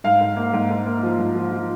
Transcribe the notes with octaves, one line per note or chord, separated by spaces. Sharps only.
G#2 F5
G#2
A#3
G#2
G#2
A#3
F3
G#2
F3
F3